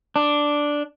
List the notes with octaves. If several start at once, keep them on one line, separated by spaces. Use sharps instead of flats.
D4